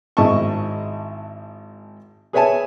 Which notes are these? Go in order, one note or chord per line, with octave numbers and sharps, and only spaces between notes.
G#1 G#2 E4 D#5 A5 C#6
G#4 B4 C#5 E5 G#5 A5